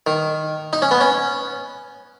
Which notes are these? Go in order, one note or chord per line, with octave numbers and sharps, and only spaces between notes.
D#3
D#4
C#4
B3
C#4